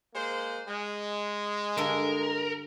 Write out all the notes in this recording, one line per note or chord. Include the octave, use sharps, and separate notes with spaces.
G#3 A#3 C5
G#3
G2 D3 A4 A#4